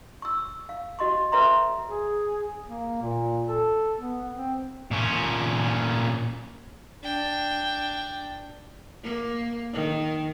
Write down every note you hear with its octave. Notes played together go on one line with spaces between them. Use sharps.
C#6 E6
F5
F#4 D#5 C6 C#6
A4 B4 C#5 E5 A#5 C6
G#4
A#3
A#2
A4
B3
C4
A#2 C#4
D4 G5
A#3
D#3